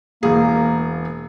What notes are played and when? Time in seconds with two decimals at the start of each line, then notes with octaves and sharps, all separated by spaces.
0.23 E1 A#3 G#4